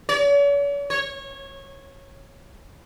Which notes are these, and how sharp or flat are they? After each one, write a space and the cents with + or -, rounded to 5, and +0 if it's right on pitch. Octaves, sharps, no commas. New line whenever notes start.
C#5 +45
C#5 -20